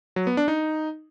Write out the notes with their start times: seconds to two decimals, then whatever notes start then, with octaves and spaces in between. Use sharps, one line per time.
0.16 F#3
0.27 B3
0.37 D4
0.48 D#4